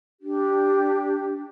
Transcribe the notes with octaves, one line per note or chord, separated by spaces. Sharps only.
D4 G4